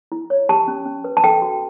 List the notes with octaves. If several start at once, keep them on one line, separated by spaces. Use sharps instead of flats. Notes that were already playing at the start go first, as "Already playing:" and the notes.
E4
C#5
G4 A5
C#4
C#4
B4
A5
A4 G5
F#4